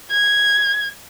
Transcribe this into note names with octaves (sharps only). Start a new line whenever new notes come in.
G#6